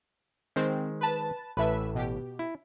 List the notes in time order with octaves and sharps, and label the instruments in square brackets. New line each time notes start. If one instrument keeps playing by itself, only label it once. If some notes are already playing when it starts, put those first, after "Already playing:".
[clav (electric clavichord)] D#3 G#3 C5 [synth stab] C4
[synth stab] B4 A5
[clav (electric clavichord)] A1 A2 A5 [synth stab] B4 E5
[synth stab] B2 G4
[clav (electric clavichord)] E4